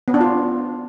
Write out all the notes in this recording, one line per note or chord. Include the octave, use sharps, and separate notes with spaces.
B3
D4
F4